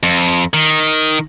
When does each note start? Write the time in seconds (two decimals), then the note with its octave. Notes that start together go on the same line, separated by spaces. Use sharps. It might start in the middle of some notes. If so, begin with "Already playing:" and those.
0.03 F2
0.54 D#3